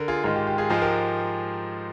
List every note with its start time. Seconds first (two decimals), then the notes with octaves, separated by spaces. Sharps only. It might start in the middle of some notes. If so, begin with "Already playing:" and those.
Already playing: D3 A#4
0.08 F4 G#4
0.24 G#2 D#3 G#3 F4
0.36 G4
0.47 G4
0.58 F4 G#4
0.70 G#2 F3 G#3 F4 G#4
0.82 G4 A#4